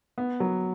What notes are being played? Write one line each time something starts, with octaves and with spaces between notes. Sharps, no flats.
B3
F#3